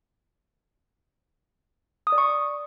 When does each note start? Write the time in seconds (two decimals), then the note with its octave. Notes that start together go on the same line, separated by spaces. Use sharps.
2.07 D#6
2.12 D5
2.18 C#6